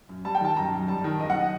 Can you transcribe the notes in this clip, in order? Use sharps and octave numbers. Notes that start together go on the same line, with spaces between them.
F#2
G3 A5
G5
D#3 A5
F#2 A#5
F#2
G3 A5
D#3
F#1 D#5
F#5
D#5